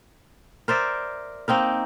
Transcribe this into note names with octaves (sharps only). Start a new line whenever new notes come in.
A#4 C5 D5 E5
A#3 C4 D#4 A#4